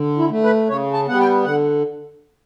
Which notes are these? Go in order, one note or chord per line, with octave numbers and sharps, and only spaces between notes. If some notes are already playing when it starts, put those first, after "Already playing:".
Already playing: D3
E4
A3
B4
C#3 C#5
A5
G3 B3 F#5
G5
D3 F#5